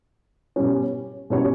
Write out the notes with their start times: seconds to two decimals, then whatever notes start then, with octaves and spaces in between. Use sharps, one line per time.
0.56 B2 G3 C#4
1.30 B2 G3 C#4 F#4 C#5